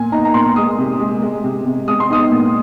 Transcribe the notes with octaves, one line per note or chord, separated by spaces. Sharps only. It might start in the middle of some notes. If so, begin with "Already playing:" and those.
Already playing: A#2 G#5
D#4 A#5
A#5
A#2 C6
G#3 D#6
C3
G#3
G#3
C3
C3
G#3 D#6
C6
D#4 D#6
A#2